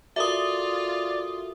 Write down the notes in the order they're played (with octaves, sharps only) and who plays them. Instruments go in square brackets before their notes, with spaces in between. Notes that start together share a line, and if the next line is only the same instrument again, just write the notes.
[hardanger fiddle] F4 [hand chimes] F#4 A4 A#4 [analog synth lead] D5 [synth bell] E5 D#6